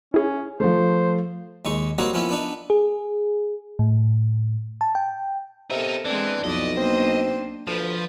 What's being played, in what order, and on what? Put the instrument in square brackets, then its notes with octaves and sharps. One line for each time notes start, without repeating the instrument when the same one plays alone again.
[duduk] C#4 [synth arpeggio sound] E4 G#4
[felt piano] F3 A3 [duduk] C5
[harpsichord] D#2 G#3 D#4 C#6
G3 A#3 C4 D#4 F#4 C#5
F3 A#3 B3 C#4 E4
B3 D4 D#4
[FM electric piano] G#4
A2
A5
G5
[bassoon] C3 [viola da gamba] B3 A4 A#4 [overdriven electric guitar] D#4 E4
[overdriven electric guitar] E3 [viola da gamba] G#3 C4 [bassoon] D4
[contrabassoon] B1 [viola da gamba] F2 E4 D5 [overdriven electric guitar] D#5
[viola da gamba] A#3 D4 C5 [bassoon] C4
[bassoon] D2 [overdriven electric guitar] F3 [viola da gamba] B4